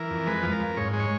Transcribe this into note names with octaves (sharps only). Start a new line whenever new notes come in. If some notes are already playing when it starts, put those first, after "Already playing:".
Already playing: E3 A#4
F2
G#3 B4
F3
A#4
F2
G#2 C#5
G#3
C#5